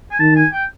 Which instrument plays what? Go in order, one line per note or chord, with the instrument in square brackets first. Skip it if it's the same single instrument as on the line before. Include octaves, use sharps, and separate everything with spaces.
[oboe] G#5
[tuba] D#3 [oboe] A5
[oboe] G#5
G5